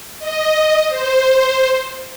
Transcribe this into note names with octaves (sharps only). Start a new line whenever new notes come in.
D#5
C5